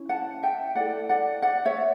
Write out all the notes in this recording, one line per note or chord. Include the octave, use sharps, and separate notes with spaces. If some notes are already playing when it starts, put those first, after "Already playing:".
Already playing: C#4 E4
F#5 A5
E5 G5
E4 A4 D5 F#5
D5 F#5
D5 F#5
C#5 E5